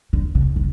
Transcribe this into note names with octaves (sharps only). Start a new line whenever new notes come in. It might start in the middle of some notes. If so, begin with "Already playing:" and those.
D3
C#3
D3